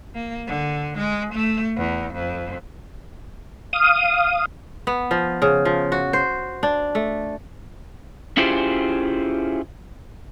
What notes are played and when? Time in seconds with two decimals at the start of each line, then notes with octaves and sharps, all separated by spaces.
0.15 A#3
0.46 D3
0.97 G#3
1.33 A3
1.77 E2
2.14 F2
3.73 F5 D#6
4.87 B3
5.11 F3
5.42 C#3
5.65 F3
5.92 F#4
6.13 C5
6.63 D4
6.95 A3
8.37 C#4 E4 F4 G4 G#4 C5